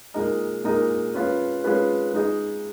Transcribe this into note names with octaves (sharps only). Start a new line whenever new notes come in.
A#2 G#3 D#4 A#4 D#5
A#2 G#3 D#4 A#4 D#5
G#3 C#4 F4 B4
G#3 C#4 F4 B4
G#3 D#4 G#4 D#5